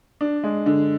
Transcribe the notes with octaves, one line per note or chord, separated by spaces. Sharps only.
D4
G#3
D3